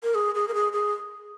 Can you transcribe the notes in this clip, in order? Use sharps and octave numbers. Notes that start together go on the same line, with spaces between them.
A#4
G#4
G#4
A#4
G#4
G#4